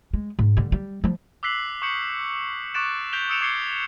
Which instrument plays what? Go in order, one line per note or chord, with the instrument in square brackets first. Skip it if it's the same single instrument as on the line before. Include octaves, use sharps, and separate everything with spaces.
[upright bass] G#3
G#2
D3 G3
G3
F3 G3
[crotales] D6 E6 F#6 B6 C7 F#7
C#6 D#6 G6 C#7 F#7
C#6 D6 F#6 A6 D7 E7
G6 B6 D7 E7 F7 G7
D#6 E6 C#7 D7 E7 F7
D6 G#6 C7 C#7 G7